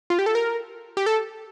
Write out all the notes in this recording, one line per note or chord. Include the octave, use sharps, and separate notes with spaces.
F4
G4
A4
A#4
G4
A4